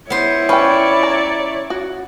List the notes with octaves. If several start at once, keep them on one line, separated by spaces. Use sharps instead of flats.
B3 E4 C5 C#5
C#4 B4 D5 G5
A#5
F#4